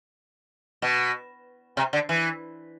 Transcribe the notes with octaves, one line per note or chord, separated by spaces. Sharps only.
B2
C3
D3
E3